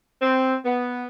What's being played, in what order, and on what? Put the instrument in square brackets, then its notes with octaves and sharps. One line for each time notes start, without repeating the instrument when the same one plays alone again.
[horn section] C4
B3